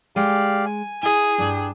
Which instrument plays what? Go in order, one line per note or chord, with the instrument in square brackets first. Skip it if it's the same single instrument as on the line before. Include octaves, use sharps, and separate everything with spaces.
[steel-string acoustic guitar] G#3 [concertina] G4 D5 F5
[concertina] G#5
[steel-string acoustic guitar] E4 [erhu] G#4
[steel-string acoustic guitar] G2 G5 [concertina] D4